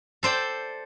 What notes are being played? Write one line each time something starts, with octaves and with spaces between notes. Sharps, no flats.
A4 C5 D5 G5